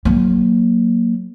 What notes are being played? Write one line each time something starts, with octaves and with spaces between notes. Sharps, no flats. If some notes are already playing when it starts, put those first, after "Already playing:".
F#3 A#3